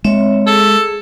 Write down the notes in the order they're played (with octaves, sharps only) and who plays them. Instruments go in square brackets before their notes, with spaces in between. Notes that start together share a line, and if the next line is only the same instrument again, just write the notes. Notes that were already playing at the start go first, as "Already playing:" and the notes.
[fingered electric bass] G#3 [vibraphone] C4 C#5 E5
[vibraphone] G#4 [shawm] A4